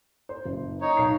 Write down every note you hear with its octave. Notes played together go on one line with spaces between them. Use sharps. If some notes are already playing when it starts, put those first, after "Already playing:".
C5
F#1
D#4 C#5
B1 C7